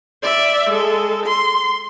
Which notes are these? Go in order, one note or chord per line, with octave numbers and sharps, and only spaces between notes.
D5 E5
G#3 A4
C6